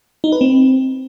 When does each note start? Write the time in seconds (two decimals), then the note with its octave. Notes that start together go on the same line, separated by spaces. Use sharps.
0.24 D#4
0.32 B4
0.41 C4